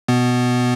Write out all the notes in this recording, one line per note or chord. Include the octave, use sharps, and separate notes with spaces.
B2 B3